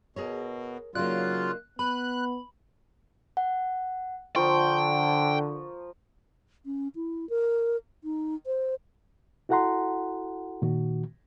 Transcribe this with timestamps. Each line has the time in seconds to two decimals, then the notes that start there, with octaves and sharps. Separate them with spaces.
0.16 B2 G#4 A#4 C#5
0.95 C#3 F#3 A#3 D#4 F4 D5 F#6
1.79 B3 B4 B5 F#6
3.37 F#5
4.36 D3 F3 A#4 G5 C6 C#6
6.65 C#4
6.95 E4
7.29 A#4
8.04 D#4
8.46 C5
9.49 E4 F#4 A4 F#5 A#5 C6
10.62 A#2 D#3 F#4